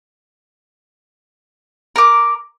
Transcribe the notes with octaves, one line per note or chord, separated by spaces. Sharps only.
A#4 D6